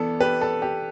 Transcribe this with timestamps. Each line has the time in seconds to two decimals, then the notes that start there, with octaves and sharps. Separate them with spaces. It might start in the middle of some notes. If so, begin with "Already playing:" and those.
Already playing: E3 B3 D4 A4
0.20 G4 B4
0.41 A4
0.62 G4